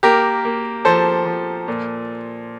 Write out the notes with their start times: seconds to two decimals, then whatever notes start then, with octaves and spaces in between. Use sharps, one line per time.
0.03 A#3 G4 A#4
0.45 A#3
0.85 F3 A4 C5
1.26 F3
1.68 A#2